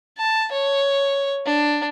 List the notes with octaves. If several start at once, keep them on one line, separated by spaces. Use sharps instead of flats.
A5
C#5
D4